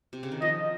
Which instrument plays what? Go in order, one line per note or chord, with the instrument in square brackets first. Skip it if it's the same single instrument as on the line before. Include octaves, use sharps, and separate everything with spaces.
[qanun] C3
C#3
D#3
[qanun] F3 [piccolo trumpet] D#5